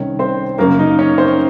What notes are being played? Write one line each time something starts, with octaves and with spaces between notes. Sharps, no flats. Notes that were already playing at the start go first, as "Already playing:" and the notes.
Already playing: C2 C3 D#3 C#4 C#5
C4 C5
F#2 C#3 A#3 A#4
D#4
C#4 C#5
C4 C5